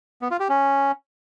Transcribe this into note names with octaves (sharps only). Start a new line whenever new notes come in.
B3
F4
G4
C#4